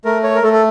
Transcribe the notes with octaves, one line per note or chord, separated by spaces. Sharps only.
A3 A#4
C#5
A#4
A3 A4
A4